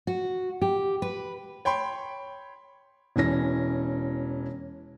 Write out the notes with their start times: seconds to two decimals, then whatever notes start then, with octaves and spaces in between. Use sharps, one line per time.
0.07 F#4
0.62 G4
1.02 B4
1.65 C#5 G5 B5 C6
3.16 E1 E3 C#4 A#6